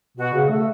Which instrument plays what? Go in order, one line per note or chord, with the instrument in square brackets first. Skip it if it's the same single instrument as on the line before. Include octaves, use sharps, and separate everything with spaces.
[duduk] B2 [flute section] F#4
[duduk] C#3
A3